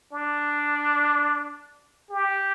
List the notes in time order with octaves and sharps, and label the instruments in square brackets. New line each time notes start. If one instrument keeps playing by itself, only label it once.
[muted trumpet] D4
G4